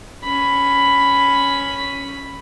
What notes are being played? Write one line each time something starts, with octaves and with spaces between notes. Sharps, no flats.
C#4 B5